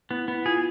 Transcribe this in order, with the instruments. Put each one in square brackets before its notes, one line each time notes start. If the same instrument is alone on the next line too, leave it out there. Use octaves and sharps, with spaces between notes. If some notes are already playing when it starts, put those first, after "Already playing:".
[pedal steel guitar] B3 [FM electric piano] E4
[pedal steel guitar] B3 [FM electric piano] E4
[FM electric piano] F4 [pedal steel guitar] G#4